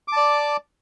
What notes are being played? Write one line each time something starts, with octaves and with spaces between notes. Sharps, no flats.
D5 A5 D6